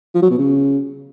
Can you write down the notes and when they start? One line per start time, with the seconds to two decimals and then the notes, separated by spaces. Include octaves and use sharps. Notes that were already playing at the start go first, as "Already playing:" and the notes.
0.15 F3
0.22 F#3
0.30 B2
0.38 C#3